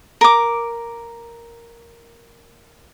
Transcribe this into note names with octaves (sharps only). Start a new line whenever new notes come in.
A#4 D6